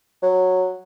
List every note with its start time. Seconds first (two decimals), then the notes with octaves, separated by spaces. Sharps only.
0.22 F#3